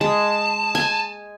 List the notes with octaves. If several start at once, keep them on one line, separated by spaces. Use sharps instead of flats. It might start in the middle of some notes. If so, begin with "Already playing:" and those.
G#3 A5
G#5